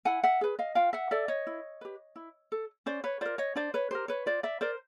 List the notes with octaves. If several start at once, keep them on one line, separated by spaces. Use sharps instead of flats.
E4 F#5 G#5
E5 F#5
G#4 B4
D#5 F5
F4 F5 G5
E5 F#5
A4 D5 E5
C#5 D#5
E4
G4 B4
E4
A4
C#4 C5 D5
B4 C#5
F4 A#4 C5 D5
C#5 D#5
D4 C5 D5
B4 C#5
G4 A#4 C5
B4 C#5
F4 C5 D5
D5 E5
A#4 C5 D5